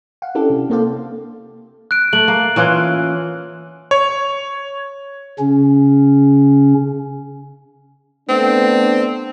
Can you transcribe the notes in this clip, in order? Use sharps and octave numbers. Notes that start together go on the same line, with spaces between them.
F5 F#5
C#4 D4 E4 G4 A4
C3
A#3 C4 A4 C5 D5 F5
F#6 D7
A3 F#7
A#3
E3 C#4 F4
C#5
C#3 C#4
A3 B3 C4 D4